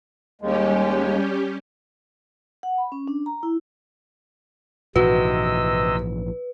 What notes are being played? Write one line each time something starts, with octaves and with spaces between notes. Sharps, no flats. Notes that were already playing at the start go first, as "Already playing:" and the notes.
D#2 G3 G#3 C#4 G4
F#5
B5
C#4
D4
A#5
E4
A#1 G#2 C3 E3 F#4 B4 D#5 E6